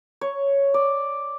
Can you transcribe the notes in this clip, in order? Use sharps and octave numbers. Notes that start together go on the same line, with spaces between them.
C#5
D5